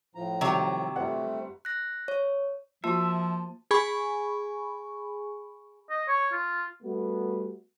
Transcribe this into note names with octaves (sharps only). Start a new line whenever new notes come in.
A2 F3 A#5
C3 D#3 F#3 G3 C4
G1 G3 A3 C4 F#5
F#6 A#6
C#5
F3 A#3 F4 F#4 E5 A5
G#4 G#5 B5 C#6
D#5
C#5
F4
G3 A3 B3 F#4